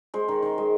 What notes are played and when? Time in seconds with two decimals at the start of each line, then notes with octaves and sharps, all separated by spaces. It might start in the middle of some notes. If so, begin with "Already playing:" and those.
0.14 G#3 C5
0.28 D#3
0.42 D#3
0.58 G#3